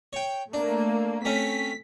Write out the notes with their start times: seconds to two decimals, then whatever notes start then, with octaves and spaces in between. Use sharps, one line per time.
0.13 C#5 G5
0.53 A3 A#3 D4
1.25 A3 C4 C#4 B6